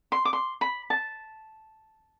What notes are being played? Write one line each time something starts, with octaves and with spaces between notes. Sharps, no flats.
C6
D6
C6
B5
A5